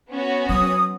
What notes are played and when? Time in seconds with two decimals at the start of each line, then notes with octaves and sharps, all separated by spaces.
0.11 B3 C#4 F#4
0.49 F#3 D#6